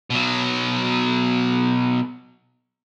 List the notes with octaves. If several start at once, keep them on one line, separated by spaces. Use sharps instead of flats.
B2 F#3